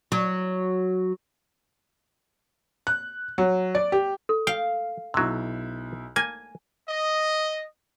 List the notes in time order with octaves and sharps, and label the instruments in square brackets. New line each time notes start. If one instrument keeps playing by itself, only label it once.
[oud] F#3
[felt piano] F#6
F#3
D5
G4
[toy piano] A4
[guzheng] F5 [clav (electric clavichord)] G5
[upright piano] B1 E4 E6 [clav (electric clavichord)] C3 F#3
[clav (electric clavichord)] A#3 [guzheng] G#5
[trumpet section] D#5